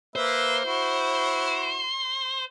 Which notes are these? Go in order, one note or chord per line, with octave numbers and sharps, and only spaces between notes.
A#3 B4 C5 E5
E4 F#4